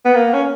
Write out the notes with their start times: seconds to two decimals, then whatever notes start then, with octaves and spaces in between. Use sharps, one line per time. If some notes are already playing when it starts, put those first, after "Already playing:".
0.05 B3
0.15 A#3
0.33 C#4